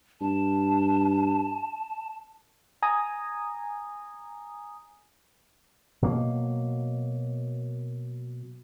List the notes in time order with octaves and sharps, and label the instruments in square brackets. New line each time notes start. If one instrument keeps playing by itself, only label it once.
[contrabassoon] G2 [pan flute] A5
[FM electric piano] G#5 A#5 D#6
[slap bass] B2 F#3 A#3